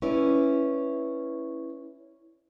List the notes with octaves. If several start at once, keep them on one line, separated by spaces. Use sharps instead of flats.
C#4 E4 B4 D5